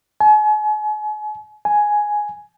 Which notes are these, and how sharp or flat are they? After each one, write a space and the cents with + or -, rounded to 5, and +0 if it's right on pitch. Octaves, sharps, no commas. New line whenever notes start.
G#5 +40
G#5 +5